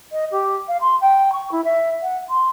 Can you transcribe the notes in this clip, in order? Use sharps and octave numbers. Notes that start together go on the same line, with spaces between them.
D#5
G4
F5
C6
G5
C#6
E4
E5
F#5
C6